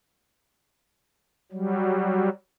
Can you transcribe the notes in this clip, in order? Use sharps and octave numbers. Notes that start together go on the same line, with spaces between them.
F#3 G3